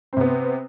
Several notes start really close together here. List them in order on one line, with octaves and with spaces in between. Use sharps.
C4 C3 B3